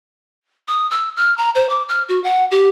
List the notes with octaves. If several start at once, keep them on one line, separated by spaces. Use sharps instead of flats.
D#6
E6
F6
A#5
C5
D6
F6
F#4
F#5
G4